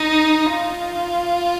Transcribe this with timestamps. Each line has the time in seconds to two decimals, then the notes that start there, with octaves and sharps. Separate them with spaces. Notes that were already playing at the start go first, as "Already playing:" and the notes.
Already playing: D#4
0.55 F4